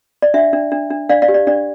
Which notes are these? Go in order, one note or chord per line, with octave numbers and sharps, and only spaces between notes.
D5
D4 E5
D4
D4
D4
D4 D5 F5
D5 F5
G4
D5
D4 D5